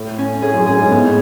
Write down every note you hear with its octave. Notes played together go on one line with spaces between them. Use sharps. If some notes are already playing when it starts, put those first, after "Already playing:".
Already playing: A2
C#4
A2 G#4
F#2
F#2 G#4
G#2
A2 B3